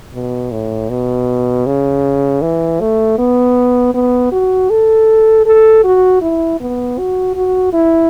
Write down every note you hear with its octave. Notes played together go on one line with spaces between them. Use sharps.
B2
A2
B2
C#3
E3
A3
B3
B3
F#4
A4
A4
F#4
E4
B3
F#4
F#4
E4